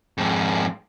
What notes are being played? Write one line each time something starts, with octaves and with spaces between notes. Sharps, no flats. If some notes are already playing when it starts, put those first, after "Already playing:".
F2 G#2